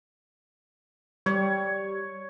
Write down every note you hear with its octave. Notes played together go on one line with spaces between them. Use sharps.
G3 C#5